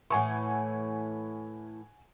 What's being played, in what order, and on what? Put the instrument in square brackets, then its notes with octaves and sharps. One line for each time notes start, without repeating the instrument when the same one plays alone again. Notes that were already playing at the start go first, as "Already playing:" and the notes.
[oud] A2 E3 [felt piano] F#5 G#5 C#6